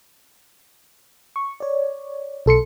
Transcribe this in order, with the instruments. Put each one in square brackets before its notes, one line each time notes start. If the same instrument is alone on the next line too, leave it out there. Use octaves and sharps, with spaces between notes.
[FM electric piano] C#6
C#5 D5
B1 A4 C6 C#7